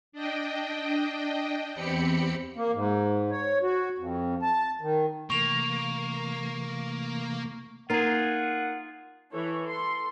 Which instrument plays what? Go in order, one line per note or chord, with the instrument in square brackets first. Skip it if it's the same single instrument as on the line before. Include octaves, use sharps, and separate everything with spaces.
[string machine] D4 D#5 G5
E2 C4 G4 B5 C#7
[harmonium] A#3
G#2
C#5
F#4
F2
A5
D#3
[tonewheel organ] C3 E3 A3 [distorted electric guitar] A#3 [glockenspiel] C#6 F7
[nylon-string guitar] A#3 D#4 [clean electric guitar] F4 G#4 [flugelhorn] F#5
[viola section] E3 A4 C#5
A4 C6